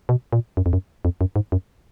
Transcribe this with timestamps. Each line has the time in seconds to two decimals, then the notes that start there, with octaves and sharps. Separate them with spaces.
0.09 B2
0.33 A#2
0.57 F#2
0.66 F2
0.73 F#2
1.05 F2
1.21 F#2
1.36 G#2
1.52 F#2